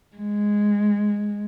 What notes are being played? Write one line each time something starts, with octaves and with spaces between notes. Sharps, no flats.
G#3